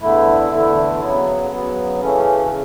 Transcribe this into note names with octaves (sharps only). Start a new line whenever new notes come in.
E2 D3 A3 E4
E2 D3 A3 E4
C#3 F#3 B3
C#3 F#3 B3
C#3 E3 A3 C#4
C#3